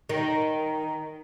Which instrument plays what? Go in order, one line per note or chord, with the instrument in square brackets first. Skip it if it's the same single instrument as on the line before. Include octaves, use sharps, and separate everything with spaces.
[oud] D#3